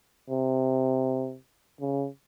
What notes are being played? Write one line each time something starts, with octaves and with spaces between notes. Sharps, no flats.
C3
C#3